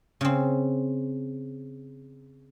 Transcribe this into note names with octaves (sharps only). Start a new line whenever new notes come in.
C#3 C4